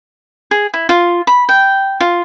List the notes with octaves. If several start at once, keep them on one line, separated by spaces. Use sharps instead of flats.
G#4
E4
F4
B5
G5
F4